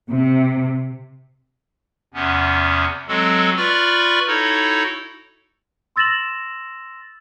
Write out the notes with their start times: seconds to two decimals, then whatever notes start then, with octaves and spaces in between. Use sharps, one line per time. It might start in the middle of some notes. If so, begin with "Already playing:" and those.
0.11 C3
2.14 E2 C3 B3 C#4
3.08 F#3 G#3 C4 F#4 A4
3.57 F4 B4 D5 B5 C#6 F6
4.27 D#4 E4 F#4 A4 C#5
5.96 C6 E6 A6 A#6 E7 F#7